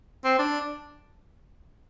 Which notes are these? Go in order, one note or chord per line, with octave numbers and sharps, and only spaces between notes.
C4
D4